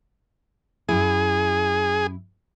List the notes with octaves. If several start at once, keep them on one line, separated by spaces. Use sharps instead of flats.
F#2 E4 G#4